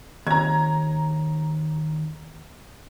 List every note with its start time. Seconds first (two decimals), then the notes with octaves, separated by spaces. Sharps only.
0.27 D#2 A#5 G#6